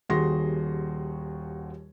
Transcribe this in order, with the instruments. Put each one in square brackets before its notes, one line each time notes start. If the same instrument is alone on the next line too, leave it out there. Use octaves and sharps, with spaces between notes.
[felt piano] D#1 D#2 F#4 G#4 C6 A#6